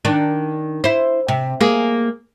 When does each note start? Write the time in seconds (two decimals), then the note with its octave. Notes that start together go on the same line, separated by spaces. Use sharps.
0.05 D#3 D4
0.84 E4 C5
1.28 C3
1.61 A#3 G#4